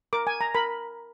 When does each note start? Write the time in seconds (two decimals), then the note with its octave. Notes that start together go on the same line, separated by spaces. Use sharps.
0.13 A#4 D6
0.27 G#5
0.41 A#5
0.55 A#4 B5